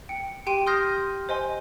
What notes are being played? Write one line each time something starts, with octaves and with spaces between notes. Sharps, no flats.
G5 C#7
G4 G5 C6 D#7
C6 D#6 F6 G6 A#6 C7
C5 D#5 G#5 C6